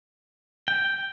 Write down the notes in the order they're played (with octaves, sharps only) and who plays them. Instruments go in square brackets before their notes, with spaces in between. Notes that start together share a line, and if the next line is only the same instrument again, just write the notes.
[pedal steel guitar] G5